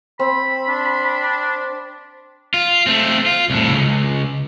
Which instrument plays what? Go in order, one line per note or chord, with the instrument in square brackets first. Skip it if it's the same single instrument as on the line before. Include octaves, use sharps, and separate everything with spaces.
[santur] C4 [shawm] B5
[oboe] D4
[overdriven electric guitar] F4
A3 C4
F4
C2 A2
C#2